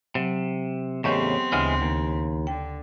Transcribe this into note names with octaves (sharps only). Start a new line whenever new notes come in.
C3 F#3
E2 A2 C#3 B3 C4 G4 D#5 C#6
D2 C#3 E3 G#3
D#2
D3 G5